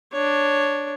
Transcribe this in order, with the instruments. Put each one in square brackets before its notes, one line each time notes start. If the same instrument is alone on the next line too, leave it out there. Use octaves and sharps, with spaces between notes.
[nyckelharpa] D4 C#5